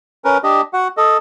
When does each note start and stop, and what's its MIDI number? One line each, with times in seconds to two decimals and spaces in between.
0.25 0.38 61
0.25 0.38 70
0.25 0.38 71
0.44 0.61 62
0.44 0.61 67
0.44 0.61 75
0.73 0.88 66
0.73 0.88 78
0.97 1.17 69
0.97 1.17 75